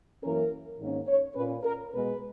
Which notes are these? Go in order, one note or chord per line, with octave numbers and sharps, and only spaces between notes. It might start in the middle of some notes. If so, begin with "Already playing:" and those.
F#2 E3 A#3 C#4 A#4
G#2 D#3 A#3 C#4
C#5
A#2 A#3 C#4 B4
A#4
B2 G#3 B3 B4